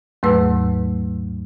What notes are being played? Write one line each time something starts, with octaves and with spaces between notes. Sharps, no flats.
D#2 G#2 F#3 A3 B4 E6